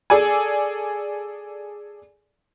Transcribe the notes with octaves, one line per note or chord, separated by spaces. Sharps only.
G#4 A4 D5 G#5